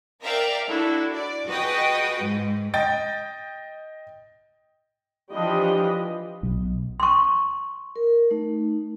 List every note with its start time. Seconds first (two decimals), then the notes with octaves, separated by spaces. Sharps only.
0.22 A#4 D5 E5 F5 G5 A#5
0.67 D4 E4 F#4 A4
1.13 D5
1.46 F#4 G#4 B4 D#5 G5 D#6
2.21 G#2
2.74 D#5 G5 A6
5.32 E3 F3 D4 G4 D#5 B5
6.43 B1
7.00 C6 C#6
7.96 A#4
8.31 A3 D#4